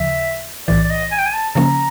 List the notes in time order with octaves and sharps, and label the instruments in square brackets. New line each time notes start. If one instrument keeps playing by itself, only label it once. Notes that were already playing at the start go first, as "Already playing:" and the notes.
Already playing: [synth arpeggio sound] D#2 C#3 F3 [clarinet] E5
[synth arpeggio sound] B1 A2 E3 [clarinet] D5
[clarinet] D5
D#5
G#5
G5
G#5
A5
[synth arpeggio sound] C#3 F3 A#3 C#4 [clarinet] A#5